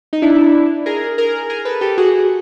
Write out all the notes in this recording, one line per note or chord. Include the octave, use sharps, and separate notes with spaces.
D#4
D4 E4
G#4 A#4
G#4 A#4
G#4 A#4
A4 B4
G4 A4
F#4 G#4